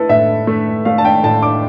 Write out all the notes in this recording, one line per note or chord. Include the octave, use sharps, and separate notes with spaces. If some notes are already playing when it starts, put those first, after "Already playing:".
Already playing: A3 E4 A4 B4
A2 E5
A3
A3 F5
A5
G5
A2 A5
D6